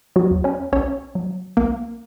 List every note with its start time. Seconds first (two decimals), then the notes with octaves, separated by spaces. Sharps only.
0.16 F#3 F#4
0.31 E2
0.44 C#4 C#5
0.72 B1 C#4 C#5
1.15 F#3
1.57 B1 A#3 A#4